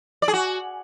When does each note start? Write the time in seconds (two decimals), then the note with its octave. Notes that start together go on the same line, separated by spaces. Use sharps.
0.22 D5
0.28 G#4
0.33 F#4